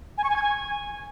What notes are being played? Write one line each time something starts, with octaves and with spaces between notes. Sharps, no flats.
G#5
C#6
G#5
G#6
G#5